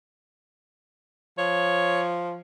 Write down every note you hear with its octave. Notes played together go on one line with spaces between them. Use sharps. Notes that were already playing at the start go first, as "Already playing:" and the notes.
F3 C#5